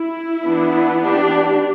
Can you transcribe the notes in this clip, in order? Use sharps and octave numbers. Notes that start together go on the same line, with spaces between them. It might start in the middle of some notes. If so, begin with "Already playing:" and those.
Already playing: E4
E3 B3 D4
D4 G4